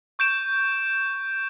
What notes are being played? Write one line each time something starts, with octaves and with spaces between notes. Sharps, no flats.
C#6 G6 D7 E7